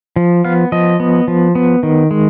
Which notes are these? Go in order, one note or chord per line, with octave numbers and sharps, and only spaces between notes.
F3
B3 F5
F3 D#5
B3
F3
B3
D#3
G#3